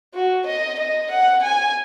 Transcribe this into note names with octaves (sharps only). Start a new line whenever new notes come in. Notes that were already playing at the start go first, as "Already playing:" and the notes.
F#4
D#5
D#5
F#5
G#5